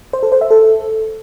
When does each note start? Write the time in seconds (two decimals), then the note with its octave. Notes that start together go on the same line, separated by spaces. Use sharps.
0.13 C5
0.23 A4
0.32 C5
0.41 E5
0.51 A4